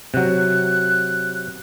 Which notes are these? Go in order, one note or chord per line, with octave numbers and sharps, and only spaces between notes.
C3 F#3 F#6